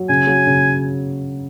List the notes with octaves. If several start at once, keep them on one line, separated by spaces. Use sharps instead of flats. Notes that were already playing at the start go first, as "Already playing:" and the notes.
Already playing: F#3
C#3 G#5
F#3
C#3